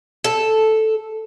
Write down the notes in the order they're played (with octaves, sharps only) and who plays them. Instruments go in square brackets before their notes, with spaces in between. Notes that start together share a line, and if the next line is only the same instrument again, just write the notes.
[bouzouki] A4